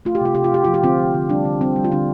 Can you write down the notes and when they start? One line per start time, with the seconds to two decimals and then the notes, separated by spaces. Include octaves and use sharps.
0.05 A3 F4
0.15 G4
0.21 C3 F4
0.35 C3 G4
0.44 F4
0.52 C3 G4
0.64 F3 F4
0.74 G4
0.83 D3 C4 F4
0.99 F3
1.14 D3
1.30 G3 D4
1.45 D3
1.61 G3 C4
1.76 G3
1.84 F4
1.92 D3 D4